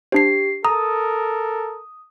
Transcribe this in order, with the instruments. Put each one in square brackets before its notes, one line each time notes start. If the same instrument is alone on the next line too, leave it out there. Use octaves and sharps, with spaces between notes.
[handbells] D4 C5 [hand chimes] G4 C7
[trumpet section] A4 A#4 [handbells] A#5 [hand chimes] D#6